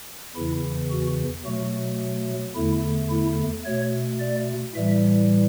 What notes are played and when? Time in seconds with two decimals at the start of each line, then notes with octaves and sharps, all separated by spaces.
0.35 E2 C#3 E3 E4
0.91 F#4
1.46 B2 F#3 A3 F#4
2.55 E2 D3 A3 E4
3.10 E4
3.65 B2 A3 C#5
4.20 D5
4.75 A2 E3 G3 E5